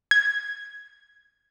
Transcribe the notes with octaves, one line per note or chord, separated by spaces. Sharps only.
G#6